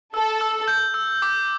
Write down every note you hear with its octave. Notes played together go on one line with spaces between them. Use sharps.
A4 E6
E6
G6
E6
D6